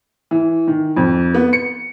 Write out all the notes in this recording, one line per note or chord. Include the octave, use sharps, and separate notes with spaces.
E3
D#3
F2
B3
C#7